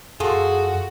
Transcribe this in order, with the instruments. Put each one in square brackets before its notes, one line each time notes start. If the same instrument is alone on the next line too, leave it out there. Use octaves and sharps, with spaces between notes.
[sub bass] F#2 [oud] F4 A4 [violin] F#4 [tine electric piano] G#4